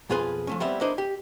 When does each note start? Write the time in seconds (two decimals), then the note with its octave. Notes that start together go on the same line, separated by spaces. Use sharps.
0.09 B1 F2 F4 G#4 B4 C6
0.47 F3 A3 C#4
0.60 G3 B3 C4 E4 D5 E5
0.81 A#3 D4 E4 B4 C5 D#5
0.98 G4